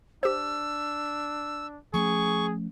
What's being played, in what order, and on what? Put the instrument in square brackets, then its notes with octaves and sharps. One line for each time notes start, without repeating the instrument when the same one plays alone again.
[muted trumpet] D4 [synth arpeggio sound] G4 C5 [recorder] E6
[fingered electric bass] F3 A3 C#4 [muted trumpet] G#4 [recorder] C#6